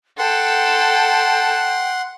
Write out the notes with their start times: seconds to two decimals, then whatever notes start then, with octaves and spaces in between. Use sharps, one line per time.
0.18 A4 F#5 G5 C6